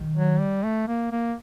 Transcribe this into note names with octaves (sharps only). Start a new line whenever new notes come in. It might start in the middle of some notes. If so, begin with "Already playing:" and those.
Already playing: D#3
F#3
G3
A3
A#3
A#3